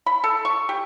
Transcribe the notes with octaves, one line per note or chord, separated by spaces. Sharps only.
B5
A4
C#6
G4